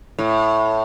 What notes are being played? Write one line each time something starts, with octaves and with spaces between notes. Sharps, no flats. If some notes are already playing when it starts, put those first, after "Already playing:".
A2